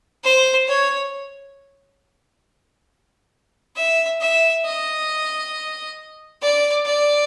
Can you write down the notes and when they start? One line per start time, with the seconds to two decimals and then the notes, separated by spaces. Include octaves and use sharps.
0.24 C5
0.67 C#5
3.76 E5
4.21 E5
4.65 D#5
6.41 D5
6.85 D5